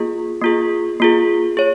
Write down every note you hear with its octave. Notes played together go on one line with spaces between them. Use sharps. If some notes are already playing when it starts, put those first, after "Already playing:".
Already playing: A#3 F4 G#4
A#3 F4 G#4
A#3 F4 G#4
G#4 C#5